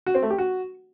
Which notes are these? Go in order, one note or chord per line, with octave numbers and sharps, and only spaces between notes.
F#4
C4
A3
G4
F#4